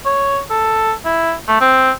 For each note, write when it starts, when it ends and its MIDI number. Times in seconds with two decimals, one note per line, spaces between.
0.06 0.40 73
0.51 0.93 69
1.05 1.33 64
1.48 1.59 57
1.61 1.91 60